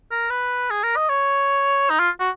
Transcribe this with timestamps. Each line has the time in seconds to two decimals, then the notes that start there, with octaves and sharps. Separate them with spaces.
0.11 A#4
0.30 B4
0.70 G#4
0.83 A#4
0.96 D#5
1.09 C#5
1.90 D#4
1.99 F4
2.20 F#4